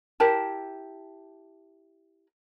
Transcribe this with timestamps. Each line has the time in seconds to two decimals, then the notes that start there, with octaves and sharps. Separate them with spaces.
0.20 E4 G4 A#4 A5